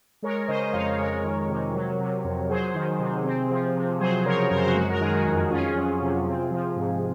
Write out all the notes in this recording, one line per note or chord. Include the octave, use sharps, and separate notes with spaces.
G#3 A#4 C#5
C#3 C5 D#5
D#5
F2 C#5 F5
G#3 A#4 C#5
D#3
C3
F#3
C3
F2
F#3 G#4 C5
D#3
C3
C4
F3
C3
F#3 G#4 C5
C#3 A#4 C#5
F#2 A#4
C5
F#4 A#4
G#3 F#4
A#4
D#3 G#4
F#4
F2
C#4 F4 G#4
F#3
C3
C4
F3
G#2